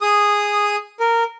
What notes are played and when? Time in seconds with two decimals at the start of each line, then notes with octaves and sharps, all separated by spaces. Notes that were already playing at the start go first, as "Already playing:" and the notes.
0.01 G#4 D#6
1.00 A#4